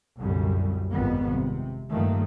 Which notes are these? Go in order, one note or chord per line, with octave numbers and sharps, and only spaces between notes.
C2 F#2 A#2 D3 G3
G#1 F2 B2 D#3 G3 B3
C3
G2 D#3 F3 A3 A#3